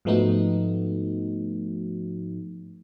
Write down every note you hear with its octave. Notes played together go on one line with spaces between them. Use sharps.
G#2 F3 A3 B3 D#4 F#4